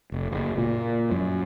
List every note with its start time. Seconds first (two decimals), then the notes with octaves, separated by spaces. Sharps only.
0.12 F1
0.32 F#1
0.58 A#2
1.11 F#2